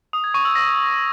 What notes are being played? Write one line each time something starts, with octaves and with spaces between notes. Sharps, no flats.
D#6
G#6
C#6
E6
A#6